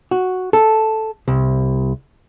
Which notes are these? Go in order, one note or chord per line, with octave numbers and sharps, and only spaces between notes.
F#4
A4
C2